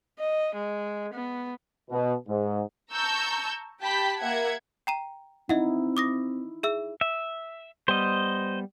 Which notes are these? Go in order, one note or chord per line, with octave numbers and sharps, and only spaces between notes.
D#5
G#3
B3
B2
G#2
A5 A#5 C#6 E6 G6
G4 G5 A5 B5 G6 B6
A#3 E5 F#5 G#6
G5 A#5 D#7
C4 D#4 E4 D#5 E5 F#5
D6 D#6 A#6
G#4 E5 E6
E5
G3 B3 C5 D#5